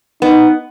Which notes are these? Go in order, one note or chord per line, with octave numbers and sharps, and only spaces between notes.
B3 D#4